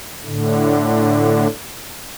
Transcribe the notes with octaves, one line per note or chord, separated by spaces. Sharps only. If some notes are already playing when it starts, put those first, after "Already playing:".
A2 D3